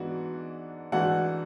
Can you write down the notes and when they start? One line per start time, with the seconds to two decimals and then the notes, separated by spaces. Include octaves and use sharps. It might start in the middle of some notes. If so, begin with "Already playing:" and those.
Already playing: G#2 E3 B3 D4 F#4
0.92 G#2 E3 A3 D4 F#4 F#5